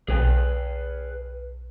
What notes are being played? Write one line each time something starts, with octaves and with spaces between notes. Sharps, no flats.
B1 G#4 B4 G5